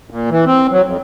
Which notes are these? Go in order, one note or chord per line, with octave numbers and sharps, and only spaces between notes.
A#2
E3
C4
F#3
F2